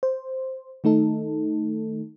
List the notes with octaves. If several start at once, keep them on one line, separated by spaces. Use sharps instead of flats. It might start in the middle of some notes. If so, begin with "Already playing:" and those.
C5
D#3 A3 D#4 A4